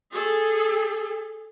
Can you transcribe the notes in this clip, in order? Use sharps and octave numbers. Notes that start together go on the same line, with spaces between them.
G#4 A4